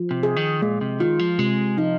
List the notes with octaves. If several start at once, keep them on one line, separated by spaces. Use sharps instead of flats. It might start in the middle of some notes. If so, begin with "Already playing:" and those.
Already playing: F3
C3
G#4
D#3
A#2 G#3
C3
D#3 F4
F3
C3 G#3
F3 D#4